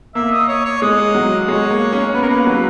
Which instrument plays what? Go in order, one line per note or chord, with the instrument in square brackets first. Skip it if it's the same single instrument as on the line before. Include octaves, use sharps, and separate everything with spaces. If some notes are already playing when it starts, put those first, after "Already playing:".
[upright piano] A#3 [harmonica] E5
[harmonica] D#5
C#5
C#5
[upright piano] G#3 [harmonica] D#5
[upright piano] F#3
[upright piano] G#3 [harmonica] C#5
[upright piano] A#3
C#4
[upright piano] B3 [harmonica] B4
[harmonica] A#4
[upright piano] A#3 [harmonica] B4
[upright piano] F#3